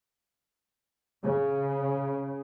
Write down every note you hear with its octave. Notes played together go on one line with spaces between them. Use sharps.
C#3